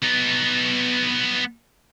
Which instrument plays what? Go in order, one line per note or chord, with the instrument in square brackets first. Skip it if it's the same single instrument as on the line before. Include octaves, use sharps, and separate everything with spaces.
[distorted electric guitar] B3 D#4